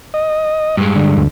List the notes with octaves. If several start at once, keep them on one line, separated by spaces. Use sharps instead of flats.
D#5
G2 G#3
D3
D2